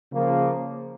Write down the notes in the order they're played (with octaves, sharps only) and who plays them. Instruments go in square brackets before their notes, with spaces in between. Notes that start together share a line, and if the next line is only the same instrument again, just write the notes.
[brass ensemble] C#3 F3 A#3